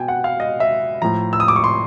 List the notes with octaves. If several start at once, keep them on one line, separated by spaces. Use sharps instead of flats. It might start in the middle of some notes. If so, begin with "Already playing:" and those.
Already playing: B2 G5 G#5
F#5
F5
D#5
E5
A2 F3 A#5
E6
D#6
D6
C#6
C6